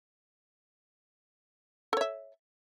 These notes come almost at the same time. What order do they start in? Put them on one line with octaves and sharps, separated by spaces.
A4 C#5 E5